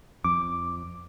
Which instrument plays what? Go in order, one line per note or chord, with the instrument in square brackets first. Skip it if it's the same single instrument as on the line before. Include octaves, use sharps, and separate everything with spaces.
[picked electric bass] F2 [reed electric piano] D6